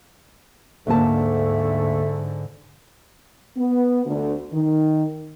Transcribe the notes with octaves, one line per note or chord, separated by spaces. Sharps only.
D2 G#2 D3 A3 A#3 A5
B3
D2
D#3